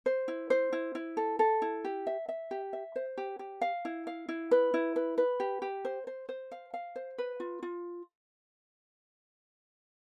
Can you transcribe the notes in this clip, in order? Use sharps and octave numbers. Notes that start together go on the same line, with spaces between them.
C5
E4
C5
E4
E4
A4
A4
E4
G4
E5
E5
G4
E5
C5
G4
G4
F5
E4
F5
E4
B4
E4
B4
B4
G4
G4
C5
C5
C5
F5
F5
C5
B4
F4
F4